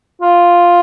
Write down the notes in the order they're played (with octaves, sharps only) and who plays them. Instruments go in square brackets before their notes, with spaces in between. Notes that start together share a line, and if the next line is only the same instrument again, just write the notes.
[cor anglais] F4